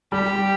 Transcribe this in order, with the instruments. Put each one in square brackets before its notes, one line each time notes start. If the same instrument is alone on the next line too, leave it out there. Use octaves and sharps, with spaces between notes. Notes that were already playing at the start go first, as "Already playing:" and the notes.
[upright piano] G3 [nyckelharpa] G4